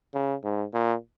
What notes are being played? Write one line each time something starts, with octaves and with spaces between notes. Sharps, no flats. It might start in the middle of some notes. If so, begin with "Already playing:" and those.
C#3
G#2
A#2